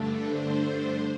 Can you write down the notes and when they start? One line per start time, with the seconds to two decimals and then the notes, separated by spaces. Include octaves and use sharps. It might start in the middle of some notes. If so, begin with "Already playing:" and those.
Already playing: G2 D3 A3 D4 A4
0.24 C5